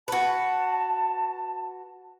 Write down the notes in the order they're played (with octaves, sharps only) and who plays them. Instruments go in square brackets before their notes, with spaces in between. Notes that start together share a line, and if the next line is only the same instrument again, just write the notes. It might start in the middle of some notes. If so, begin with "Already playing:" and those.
[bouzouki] F#4 B4 [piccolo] A5